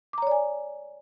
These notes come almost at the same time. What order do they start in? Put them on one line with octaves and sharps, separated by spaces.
D6 A#5 C#5 D5 G#5